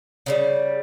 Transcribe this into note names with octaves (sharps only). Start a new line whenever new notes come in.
C#3 E3 G3